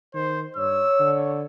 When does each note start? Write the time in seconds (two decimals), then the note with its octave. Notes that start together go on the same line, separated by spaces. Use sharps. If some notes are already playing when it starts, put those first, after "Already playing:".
0.14 D#3 C5
0.56 G2 C#5 E6
1.00 D3